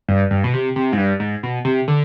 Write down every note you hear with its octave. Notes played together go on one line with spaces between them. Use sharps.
G2
G2
B2
C3
C3
G#2
G2
G#2
B2
C3
D3